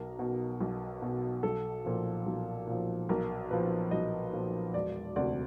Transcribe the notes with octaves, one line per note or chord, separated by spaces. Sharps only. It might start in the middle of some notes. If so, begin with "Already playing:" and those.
Already playing: B1 A#4
B2
B1
B2
B1 A4
A#2 F3
B1
A#2 F3
B1 A#4
A#2 F3 B4
B1 D#5
A#2 F3
E1 D5
D2 C3 D5